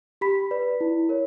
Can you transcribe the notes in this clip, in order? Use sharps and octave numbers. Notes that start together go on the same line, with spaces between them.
G4 B5 B6
B4 D5
E4
A#4 C#5